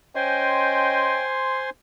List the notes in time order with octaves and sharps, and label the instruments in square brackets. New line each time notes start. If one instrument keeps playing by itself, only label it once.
[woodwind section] C#4 D#5 G5 [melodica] C5 G#5 C6